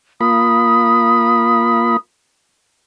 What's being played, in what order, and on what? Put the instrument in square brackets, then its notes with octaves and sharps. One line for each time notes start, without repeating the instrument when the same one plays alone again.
[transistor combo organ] A#3 F4 B5 [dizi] D#6